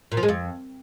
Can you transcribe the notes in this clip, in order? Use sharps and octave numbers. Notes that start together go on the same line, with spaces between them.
A#2
F3
G#3
F2